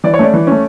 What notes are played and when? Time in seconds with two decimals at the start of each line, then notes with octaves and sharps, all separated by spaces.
0.04 E3 D5
0.14 C#5
0.19 A3 C#4 D5
0.34 E3
0.47 A3 C#4